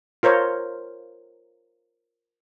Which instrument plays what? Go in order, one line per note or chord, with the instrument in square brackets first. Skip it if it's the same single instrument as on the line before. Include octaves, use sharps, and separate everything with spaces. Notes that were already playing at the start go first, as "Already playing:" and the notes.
[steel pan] F4 A#4 C5 C#5